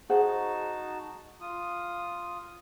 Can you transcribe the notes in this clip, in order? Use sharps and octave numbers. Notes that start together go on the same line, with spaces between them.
D#4 F#4 G#4 C5 F#5 A5
F4 D#6